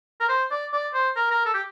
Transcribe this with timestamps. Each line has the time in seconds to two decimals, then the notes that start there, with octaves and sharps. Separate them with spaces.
0.21 A#4
0.29 C5
0.51 D5
0.73 D5
0.94 C5
1.17 A#4
1.31 A#4
1.46 A4
1.54 G4